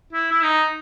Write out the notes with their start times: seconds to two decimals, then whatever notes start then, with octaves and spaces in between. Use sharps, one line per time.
0.13 E4
0.32 E4
0.44 D#4